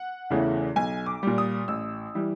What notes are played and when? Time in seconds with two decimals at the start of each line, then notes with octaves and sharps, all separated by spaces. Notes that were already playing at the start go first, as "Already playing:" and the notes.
Already playing: F#5
0.30 E2 C#3 E3 A3
0.76 B1 G#5
1.06 D6
1.23 A#2 G3
1.38 D#6
1.68 A1 E6
2.15 E3 G3